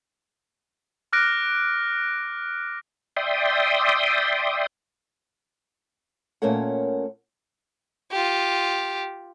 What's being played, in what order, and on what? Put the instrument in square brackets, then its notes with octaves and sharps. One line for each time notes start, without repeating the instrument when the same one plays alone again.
[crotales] D6 F6 F#6 A#6 D7
[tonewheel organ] D5 E5 G5 C6 D#6
[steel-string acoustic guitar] A#2 A3 C#4 A#4 C#5 F#5
[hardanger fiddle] F4 G4